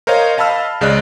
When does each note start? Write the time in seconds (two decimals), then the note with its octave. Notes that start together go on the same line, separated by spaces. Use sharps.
0.07 A#4 C5 C#5 D#5 F5
0.37 D#5 F5 A5 B5 E6 F6
0.81 C#2 C#3 G#3 D5 D#5 F#6